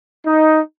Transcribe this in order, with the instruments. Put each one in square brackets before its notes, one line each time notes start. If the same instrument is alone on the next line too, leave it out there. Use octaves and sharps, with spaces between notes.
[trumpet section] D#4